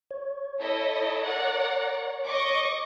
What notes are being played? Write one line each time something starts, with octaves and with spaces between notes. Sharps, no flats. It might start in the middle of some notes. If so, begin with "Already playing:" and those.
C#5
E4 A4 D#5
A#4 D5 F#5
D#5 C#6 D6